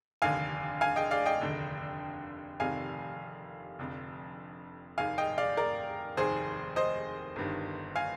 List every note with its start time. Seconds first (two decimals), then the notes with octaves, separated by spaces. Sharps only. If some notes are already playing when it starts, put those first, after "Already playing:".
0.22 F1 D#2 D3 F5 G#5
0.81 F5 G#5
0.96 D#5 G5
1.11 D5 F5
1.26 D#5 G5
1.41 F1 D#2 D3
2.60 F1 F2 C3 D#3 F5 G#5
3.79 F1 F2 D3
4.98 F1 D#2 D#3 F5 G#5
5.18 D#5 G5
5.38 D5 F5
5.57 A#4 D5
6.17 F1 D#2 D#3 G#4 C5
6.76 C5 D#5
7.36 G1 G2 D#3
7.96 F5 G#5